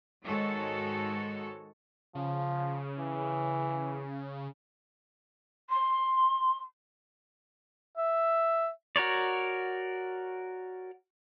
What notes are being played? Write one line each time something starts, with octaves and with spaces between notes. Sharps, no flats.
G#2 D#3 G#3 F#4 A4 C#5
C#3 F3
E3
C6
E5
F#4 A#4 C#5 D5